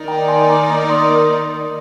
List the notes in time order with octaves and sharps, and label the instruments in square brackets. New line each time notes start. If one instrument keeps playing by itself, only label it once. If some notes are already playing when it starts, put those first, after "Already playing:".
Already playing: [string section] D#3 A#3 D#4 A#4 D5
[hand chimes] G5 A#5
G#5 C6
A#5 D6
A#5 D6
C6 D#6